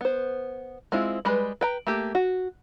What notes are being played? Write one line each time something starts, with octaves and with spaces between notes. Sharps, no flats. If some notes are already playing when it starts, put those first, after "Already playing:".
B3 C5
G#3 C4 E4 F4
G3 G#3 B4 B5
B4 G5 A#5
A3 A#3 G4
F#4